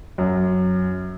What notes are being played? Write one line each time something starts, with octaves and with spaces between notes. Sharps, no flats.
F#2